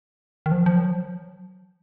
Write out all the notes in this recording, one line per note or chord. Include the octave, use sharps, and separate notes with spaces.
D#3
F3
F3
F#3